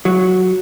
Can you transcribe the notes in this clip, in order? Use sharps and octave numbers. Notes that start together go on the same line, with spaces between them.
F#3